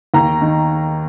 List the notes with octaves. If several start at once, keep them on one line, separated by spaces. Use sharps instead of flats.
D#2 A#5
D#3